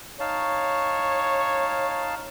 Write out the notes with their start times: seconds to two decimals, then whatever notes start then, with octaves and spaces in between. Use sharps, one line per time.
0.20 D#4 C#5 F5 A5